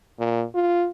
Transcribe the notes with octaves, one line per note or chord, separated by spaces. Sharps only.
A#2
F4